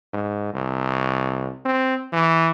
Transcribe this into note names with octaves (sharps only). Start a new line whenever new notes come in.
G#2
C2
C4
E3